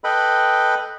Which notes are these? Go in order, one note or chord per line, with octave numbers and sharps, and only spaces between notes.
A4 B4 D#5 G5 B5